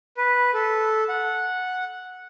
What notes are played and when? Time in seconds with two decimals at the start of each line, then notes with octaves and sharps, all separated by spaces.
0.17 B4
0.54 A4
1.09 F#5